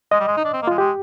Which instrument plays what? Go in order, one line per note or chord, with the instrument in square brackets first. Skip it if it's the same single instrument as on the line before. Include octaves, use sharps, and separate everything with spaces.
[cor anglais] G#3 [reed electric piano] D#5
[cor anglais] G3
G#3
D#4
D4
C4
A#3
[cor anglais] G#3 [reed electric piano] F4
[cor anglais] G#3 [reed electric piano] G4